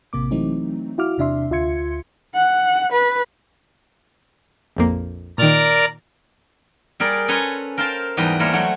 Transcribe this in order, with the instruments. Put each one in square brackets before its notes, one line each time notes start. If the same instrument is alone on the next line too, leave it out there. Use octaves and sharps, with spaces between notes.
[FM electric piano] A1 C3 A#3 D6
E3 F#3 A3 C4 D#4
E4 F#4 F5 D6 F6
E2 C3 D4 E5 C6
D2 F4 E5 C6 G#6 C#7
[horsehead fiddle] F#5
B4
[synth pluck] A#1 F2 A#3
[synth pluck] A#2 D#3 [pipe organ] A#4 D5 A#5
[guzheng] G3 G#4 A#4 D5
C#4 A4 B4 G#5 A#5 C6
A#4 C5 F5 G5 A5
E2 G#2 G3 B4 G5 A#5
G3 A3 A#3 A#4 C5 C#5
F#3 A3 F#4